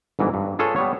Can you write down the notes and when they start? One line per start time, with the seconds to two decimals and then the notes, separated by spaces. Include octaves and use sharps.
0.19 G1 G#2 E3
0.34 G2
0.59 F4 G#4 A4 B4 C#5
0.76 G3 B3 C#5